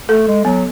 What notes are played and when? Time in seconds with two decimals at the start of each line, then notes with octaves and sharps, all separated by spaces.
0.08 A3 A4
0.27 G#3
0.45 F#3 B3